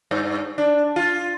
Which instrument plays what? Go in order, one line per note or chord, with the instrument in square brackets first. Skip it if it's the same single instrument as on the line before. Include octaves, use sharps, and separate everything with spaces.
[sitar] G2
D4
F4